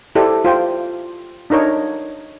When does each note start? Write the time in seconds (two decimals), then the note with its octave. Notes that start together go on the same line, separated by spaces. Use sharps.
0.15 E4 G4 A4 C5 D5
0.45 F4 C5 G5
1.50 D4 D#4 A#4 C#5